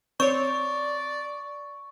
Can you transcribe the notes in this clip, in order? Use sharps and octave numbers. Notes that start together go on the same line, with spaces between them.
C4 C#5 D5 C#6